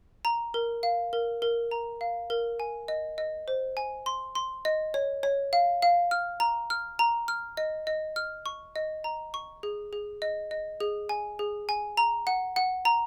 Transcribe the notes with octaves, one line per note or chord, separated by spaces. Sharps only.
A#5
A#4
F5
A#4
A#4
A#5
F5
A#4
G#5
D#5
D#5
C5
G#5
C6
C6
D#5
C#5
C#5
F5
F5
F6
A#5
F6
A#5
F6
D#5
D#5
F6
C#6
D#5
A#5
C#6
G#4
G#4
D#5
D#5
G#4
G#5
G#4
G#5
A#5
F#5
F#5
A#5